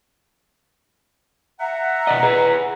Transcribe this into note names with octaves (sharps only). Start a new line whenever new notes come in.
E5 F#5 A#5
B2 D5 D#5
G#4 B4